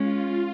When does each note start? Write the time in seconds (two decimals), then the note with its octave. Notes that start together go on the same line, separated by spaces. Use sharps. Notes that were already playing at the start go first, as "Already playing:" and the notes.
Already playing: G#3 C#4 F4